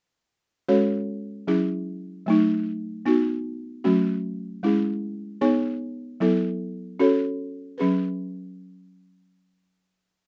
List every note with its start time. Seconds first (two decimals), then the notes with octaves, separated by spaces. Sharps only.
0.68 G#3 C#4 F#4 A4 C#5
1.47 F#3 C#4 E4 G#4
2.26 F#3 A3 D#4
3.06 B3 D#4 F#4
3.84 F#3 A3 C#4 F#4
4.63 G#3 C#4 E4 G#4
5.41 B3 D#4 G#4 C#5
6.20 F#3 B3 E4 A4
6.99 C#4 F#4 A4 C#5
7.78 F#3 C#4 G#4 B4